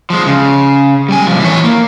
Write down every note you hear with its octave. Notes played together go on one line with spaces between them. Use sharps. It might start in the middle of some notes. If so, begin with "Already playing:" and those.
F3 G#3
C#3
G3 G#5
C2 F3
E3 C#5
A#3